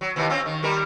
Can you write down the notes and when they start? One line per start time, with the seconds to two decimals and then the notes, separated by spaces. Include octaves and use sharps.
0.01 F#3
0.16 D#2 C3 E3
0.30 C4 C#4 F4
0.46 D#3
0.63 D#3 G3 A#4